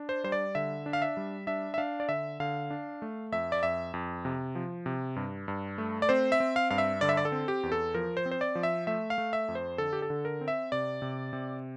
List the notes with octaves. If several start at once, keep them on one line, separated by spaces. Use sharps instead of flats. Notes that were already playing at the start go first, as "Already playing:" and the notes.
Already playing: D4
C5
G3 C5
D5
D3 E5
D4
F5
E5
G3
D4 E5
E5
D4 F5
D5
D3 E5
D3 F5
D4
A3
F2 E5
D5
F2 E5
F2
C3
F3
C3
G2
G2
A3
D5
C4 C5
E5
C4
F5
G2 F5
E5
D3 D5
E5
D5
A4
C4
G4
E2
A4
F3 A#4
C5
C4
C5
D5
F3
E5
A3 E5
F5
A3
E5
F2
C5
D3 A4
G4
A4
D3
A#4
C4
E5
C3 D5
C3
C3